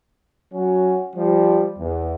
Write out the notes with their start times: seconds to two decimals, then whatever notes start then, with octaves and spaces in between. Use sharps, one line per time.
0.53 F#3 C#4 F#4
1.16 F3 G3
1.77 E2